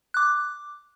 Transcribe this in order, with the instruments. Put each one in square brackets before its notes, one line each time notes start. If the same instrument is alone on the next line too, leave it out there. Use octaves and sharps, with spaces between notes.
[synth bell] D6 F#6